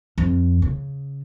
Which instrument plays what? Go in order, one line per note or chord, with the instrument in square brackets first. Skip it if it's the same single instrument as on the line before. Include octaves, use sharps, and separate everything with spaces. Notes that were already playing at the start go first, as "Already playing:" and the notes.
[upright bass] F2
C#3